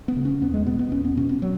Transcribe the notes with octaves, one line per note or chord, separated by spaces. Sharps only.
B3
C#3
C#4
E2 B3
G#3
B2 B3
B3
E2 C#4
B3
B2 C#4
B3
F#3